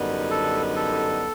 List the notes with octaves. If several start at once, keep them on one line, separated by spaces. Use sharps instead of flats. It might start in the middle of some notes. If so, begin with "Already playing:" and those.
Already playing: F#2 D3 G3 B3 D#4
A4
A4